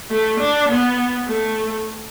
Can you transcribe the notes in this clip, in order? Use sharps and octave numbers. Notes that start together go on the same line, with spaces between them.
A3
D4
B3
A3